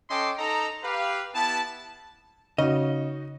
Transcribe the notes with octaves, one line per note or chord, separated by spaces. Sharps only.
C#4 A4 D#5 G5 C6 D6
D#4 A4 D#5 A#5
G4 B4 F5
B3 E4 G4 A5
C#3 D#4 F#4 D#5